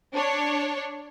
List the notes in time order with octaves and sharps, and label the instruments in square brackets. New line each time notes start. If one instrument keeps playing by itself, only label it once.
[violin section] D4 C#5